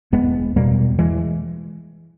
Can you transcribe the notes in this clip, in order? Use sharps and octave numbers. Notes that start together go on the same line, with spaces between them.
E1 G#3 B3
E2 B2 G3 A#3
E3 G#3